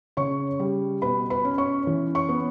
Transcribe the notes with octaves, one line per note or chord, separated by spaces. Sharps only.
C#3 C#5 C#6
G3
B2 B4 B5
B4 B5
C#4
C#5 C#6
E3
C#5 C#6
B3